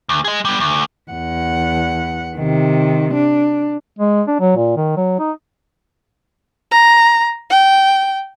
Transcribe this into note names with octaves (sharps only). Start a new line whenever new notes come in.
D2
G#4 D#5
G3 B3
D2
E2 F#5
C3 D#3
D4
G#3
D4
F#3
A#2
D#3
F#3
D#4
A#5
G5